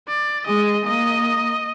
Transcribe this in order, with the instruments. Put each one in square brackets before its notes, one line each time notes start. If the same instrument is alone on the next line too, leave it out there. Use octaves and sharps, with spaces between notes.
[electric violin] D5
[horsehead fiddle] G#3 [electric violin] D#5
[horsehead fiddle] A#3 [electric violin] D#5